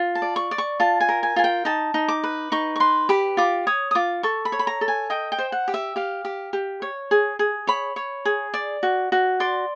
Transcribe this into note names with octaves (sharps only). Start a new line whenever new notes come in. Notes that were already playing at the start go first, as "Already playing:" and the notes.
Already playing: F4
A5
D5
C#6
D5
C#6
F4 A5
G#5
A#4
G#5
F4 G#5
G5
D#4 A5
D#4
D6
B4
D#4 C#6
C#6
B4 C6
G4 B5
F4 D6
C#5 D#6
D#6
F4 D6
A4 C#6
B5
C#5
B5
A#5
A4
G#5
D#5 G5
G5
C5
F#5
G4
E5
G4 F5
G4
G4
C#5
G#4
G#4
C#5 B5
C#5
G#4
D5
F#4
F#4
D5 C6